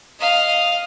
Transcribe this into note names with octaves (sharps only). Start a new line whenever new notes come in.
D#5 F5